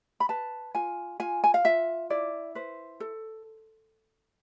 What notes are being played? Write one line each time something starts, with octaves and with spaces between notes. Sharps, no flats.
B5
B4 A5
F4 G#5
F4 G#5
G#5
F5
F4 E5
E4 D5
B4 C5
A4